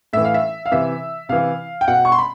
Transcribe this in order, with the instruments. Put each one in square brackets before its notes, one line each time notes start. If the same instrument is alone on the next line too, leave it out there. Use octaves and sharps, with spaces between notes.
[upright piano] A2 E3 E5
F5
E5
F5
C3 E3 E5
C3 E3 F5
G5
B2 F#5
C#6
C6
B5